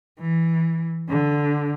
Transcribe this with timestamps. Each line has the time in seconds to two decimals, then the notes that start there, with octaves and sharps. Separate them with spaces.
0.20 E3
1.09 D3